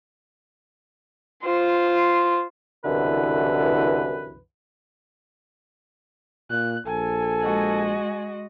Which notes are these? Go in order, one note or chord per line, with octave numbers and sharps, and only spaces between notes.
F4 C5
C2 F#2 B2 D3 E3 B4
A#2 F#6
A#1 A4 G#5
G#3 F#4 D#5